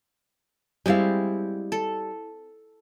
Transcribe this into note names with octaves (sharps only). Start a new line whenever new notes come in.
G3 G#3 C4 E4 D5 F5
A4